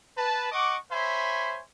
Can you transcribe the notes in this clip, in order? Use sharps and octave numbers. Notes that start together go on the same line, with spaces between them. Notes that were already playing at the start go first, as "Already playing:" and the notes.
B4 A5
D#5 F#5 C#6 D6
C5 C#5 E5 G#5 B5 C6